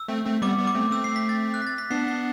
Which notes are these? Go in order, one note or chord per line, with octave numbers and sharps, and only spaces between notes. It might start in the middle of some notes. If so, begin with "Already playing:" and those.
Already playing: E6
A3 C4
A3 C4
G3 B3 D6
G3 B3
D6
A3 C4
A3 C4 E6
C7
B6
A6
F#6
B6
A6
B6
B3 D4 C7
C7